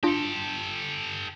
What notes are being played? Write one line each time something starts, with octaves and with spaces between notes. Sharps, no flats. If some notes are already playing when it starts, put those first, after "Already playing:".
D4 F4 G4 A4